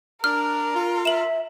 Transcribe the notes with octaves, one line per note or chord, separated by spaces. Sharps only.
D4 A#4 F6
F4
E5 E7 F#7